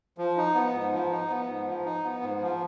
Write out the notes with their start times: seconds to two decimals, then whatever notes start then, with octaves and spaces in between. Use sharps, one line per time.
0.18 F3
0.37 D#4
0.55 B3
0.73 G#2
0.92 F3
1.11 D#4
1.30 B3
1.48 G#2
1.66 F3
1.86 D#4
2.04 B3
2.22 G#2
2.41 F3